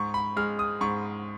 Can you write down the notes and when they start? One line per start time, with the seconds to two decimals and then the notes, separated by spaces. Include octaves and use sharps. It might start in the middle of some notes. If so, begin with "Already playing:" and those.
Already playing: G#2 C#6
0.14 B5
0.36 G#3 F6
0.59 D#6
0.81 G#2 C#6